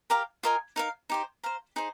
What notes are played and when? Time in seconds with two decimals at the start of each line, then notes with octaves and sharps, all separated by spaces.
0.10 G4 A#4 F5 A#5
0.43 F4 A#4 D#5 G#5
0.76 D#4 A#4 F5
1.10 D#4 G4 C5
1.43 C5 F5 A#5
1.76 D#4 G#4 C5